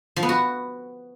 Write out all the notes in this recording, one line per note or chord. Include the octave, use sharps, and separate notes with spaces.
F3
B3
F#4